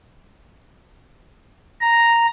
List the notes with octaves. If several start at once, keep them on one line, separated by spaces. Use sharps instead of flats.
A#5